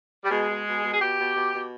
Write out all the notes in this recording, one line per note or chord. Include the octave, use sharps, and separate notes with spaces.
G3
B2 G#3
B2
B2
B2
G#4
B2 G4
B2
B2
B2